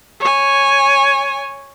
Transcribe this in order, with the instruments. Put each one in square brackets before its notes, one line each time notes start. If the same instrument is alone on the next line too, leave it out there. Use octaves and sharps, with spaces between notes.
[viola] C#5 G#5